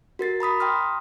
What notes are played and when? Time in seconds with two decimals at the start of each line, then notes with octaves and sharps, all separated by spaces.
0.19 F#4 A#4 A6 C7
0.40 A#5 B5 D#6 B6
0.60 G5 A#5 C6 D#6 F6